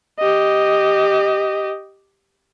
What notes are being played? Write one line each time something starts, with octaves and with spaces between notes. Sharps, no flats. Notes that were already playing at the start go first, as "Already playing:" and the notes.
G4 D#5